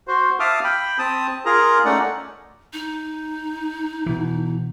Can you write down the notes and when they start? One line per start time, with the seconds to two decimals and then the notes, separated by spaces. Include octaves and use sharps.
0.08 F#4 C5
0.40 E5 F5 A5 D6 D#6 F6
0.64 G5 B5
0.99 C4 A5 D#6
1.46 F4 G#4 A#4 A#5
1.85 A3 C#4 D#4 D5 F#5
2.73 D#4
4.06 B2 E3